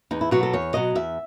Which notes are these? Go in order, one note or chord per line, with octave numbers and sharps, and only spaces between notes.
E2 D#4
E4
B2 F#3 F#4
A4
E2 C#5
B2 F#3 D#5
E2 E5